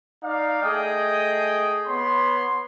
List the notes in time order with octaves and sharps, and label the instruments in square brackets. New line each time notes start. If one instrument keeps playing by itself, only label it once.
[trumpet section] D#4 D5 F5
A3 G#4 D#5 G5 D#6
B3 C#5 B5 C6